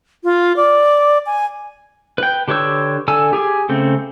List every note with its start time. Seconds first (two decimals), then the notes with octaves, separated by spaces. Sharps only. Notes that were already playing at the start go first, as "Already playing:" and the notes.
0.24 F4
0.56 D5
1.26 G#5
2.18 B4 G5
2.48 D3 G4 B4 C#5 E6
3.08 D3 A4 G#5 E6
3.33 G4 G#4 G#5
3.69 C#3 A3 C4